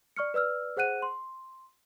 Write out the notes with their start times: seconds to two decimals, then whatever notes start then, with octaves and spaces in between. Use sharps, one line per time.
0.16 D5 C#6 F6 C#7
0.34 B4 D5 E6 F6
0.77 G#4 C5 F#5 F#6 D#7
1.02 C6